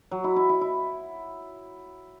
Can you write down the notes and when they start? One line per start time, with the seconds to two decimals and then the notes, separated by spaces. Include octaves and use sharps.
0.11 F#3
0.24 E4
0.36 E4
0.49 E4
0.61 E4